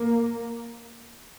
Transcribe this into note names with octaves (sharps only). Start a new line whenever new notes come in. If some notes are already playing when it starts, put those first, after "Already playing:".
Already playing: A#3